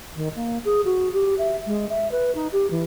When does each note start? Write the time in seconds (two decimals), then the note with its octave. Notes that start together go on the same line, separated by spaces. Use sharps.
0.16 D#3
0.36 A#3
0.65 G#4
0.85 F#4
1.13 G4
1.38 E5
1.66 G#3
1.89 E5
2.11 B4
2.35 D#4
2.52 G4
2.70 E3